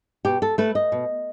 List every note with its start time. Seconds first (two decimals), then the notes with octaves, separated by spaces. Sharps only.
0.25 B2 G4
0.42 A4
0.58 A3 B4
0.75 D#5
0.92 B2